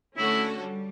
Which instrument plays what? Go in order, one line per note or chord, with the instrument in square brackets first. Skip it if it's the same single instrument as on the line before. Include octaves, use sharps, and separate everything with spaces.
[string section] D3 A3 C#4 F#4 A4 [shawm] E4
[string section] G3